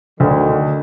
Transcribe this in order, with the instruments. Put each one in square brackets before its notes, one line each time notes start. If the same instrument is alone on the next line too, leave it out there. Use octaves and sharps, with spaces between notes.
[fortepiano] D2 [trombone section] D3 D#3